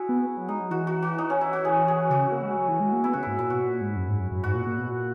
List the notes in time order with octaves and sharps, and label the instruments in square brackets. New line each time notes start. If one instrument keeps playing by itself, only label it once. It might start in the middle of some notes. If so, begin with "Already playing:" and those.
Already playing: [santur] E4 F#4 G#4
[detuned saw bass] B3
F#3
[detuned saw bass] G#3 [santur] D#4
[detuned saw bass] F#3
[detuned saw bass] E3 [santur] F#4
[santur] F#4
F#4
D#4
C#4
E4
F#4
G#4
G#4
[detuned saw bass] C#3 [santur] F#4
[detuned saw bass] A#3
G#3
F#3
E3
G#3
A#3
[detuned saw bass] B3 [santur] E4
[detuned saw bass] C#3 [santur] F#4
[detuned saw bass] G#2 [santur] E4
[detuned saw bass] A#2 [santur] E4
[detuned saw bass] B2 [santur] F#4
[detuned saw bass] A#2
G#2
F#2
G#2
F#2
F#2
[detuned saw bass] G#2 [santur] F#4
[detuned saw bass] A#2
A#2
B2
A#2